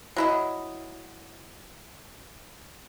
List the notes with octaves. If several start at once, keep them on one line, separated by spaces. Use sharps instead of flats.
F#3 E4 D#5